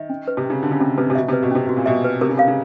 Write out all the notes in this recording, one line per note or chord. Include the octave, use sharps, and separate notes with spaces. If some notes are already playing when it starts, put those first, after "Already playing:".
Already playing: D#3 E5
C#4
B4
C3
C#3 C#4
D3 F#4
C#3
C3 C#4
C3 B4
C3
B2 E5
C3
B4
B2
C3 C#4
B2 F#4
A#2
B2 E5
B4
C3 A#4
C#3
C3 F5
C#3